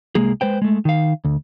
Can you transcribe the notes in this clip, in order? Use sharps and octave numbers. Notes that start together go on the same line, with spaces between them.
C2 G#3 A#3 G#4
G#3 B4 C5 G5
G#3 A3
D#3 F5
D2